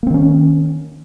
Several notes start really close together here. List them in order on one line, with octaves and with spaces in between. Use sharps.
A#3 C4 D#3 C#4